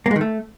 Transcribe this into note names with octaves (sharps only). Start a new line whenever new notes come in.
A#3
G#3
D#3
A3